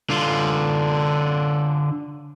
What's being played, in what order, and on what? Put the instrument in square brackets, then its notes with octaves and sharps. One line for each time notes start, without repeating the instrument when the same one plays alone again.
[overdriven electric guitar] D3 F4